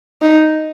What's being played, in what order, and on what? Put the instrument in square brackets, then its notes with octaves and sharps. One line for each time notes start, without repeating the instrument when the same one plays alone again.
[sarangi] D#4